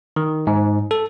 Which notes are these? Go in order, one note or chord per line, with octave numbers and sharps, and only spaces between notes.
D#3
G#2
A4